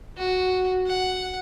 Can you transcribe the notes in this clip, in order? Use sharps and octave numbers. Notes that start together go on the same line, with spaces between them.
F#4
F#5